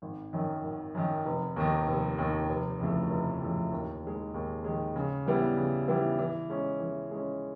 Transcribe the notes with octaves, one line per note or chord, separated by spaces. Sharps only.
G#1
F#2 D#3
G#1
F#2 D#3
F1
D#2 D#3
F1
D#2 D#3
F1
F2 C#3 E3 A3
F1
F2 C#3 E3 A3
D#2
D#3 G#3
D#2
D#3 G#3
C#3
E3 G3 B3 E4
C#3
E3 G3 B3 E4
E3
G#3 C#4
E3
G#3 C#4